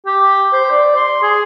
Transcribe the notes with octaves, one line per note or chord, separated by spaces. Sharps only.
G4
C5
D5
C6
G#4